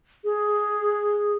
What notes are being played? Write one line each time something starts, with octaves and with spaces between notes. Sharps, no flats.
G#4